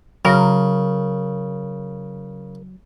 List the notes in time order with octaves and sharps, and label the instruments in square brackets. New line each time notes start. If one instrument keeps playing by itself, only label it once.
[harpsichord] C#3 [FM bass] F#3 [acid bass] A#4